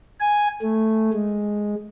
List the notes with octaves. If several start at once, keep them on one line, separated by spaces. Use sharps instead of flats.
G#5
A3
G#3